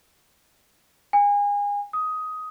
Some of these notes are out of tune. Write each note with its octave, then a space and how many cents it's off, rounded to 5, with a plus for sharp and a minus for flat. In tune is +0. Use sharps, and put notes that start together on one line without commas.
G#5 -30
D#6 +15